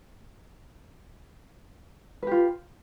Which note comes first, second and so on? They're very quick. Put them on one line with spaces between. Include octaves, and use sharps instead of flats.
B4 G4 F4